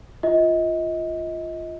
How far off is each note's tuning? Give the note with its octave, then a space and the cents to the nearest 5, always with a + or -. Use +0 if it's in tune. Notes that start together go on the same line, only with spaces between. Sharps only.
F4 -5 D#5 +30